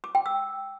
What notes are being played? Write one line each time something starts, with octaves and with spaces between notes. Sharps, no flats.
D6
G5
E6